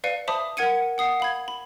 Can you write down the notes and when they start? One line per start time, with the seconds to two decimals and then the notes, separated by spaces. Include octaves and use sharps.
0.04 B4 D5 F5 C#7 D#7
0.28 C5 E5 A5 B5 D6 D#6
0.57 A#4 F#5 G#6 C#7 D#7
0.98 F#5 D#6 C7
1.20 F5 B5 G#6
1.48 B5